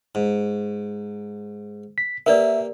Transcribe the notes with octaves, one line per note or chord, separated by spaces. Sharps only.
G#2
B6
A#3 G4 A#4 B4 D5 E5